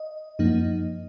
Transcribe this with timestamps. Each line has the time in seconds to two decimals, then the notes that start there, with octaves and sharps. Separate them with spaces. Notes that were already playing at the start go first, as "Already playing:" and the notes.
Already playing: D#5
0.39 F#2 F3 A#3 D#4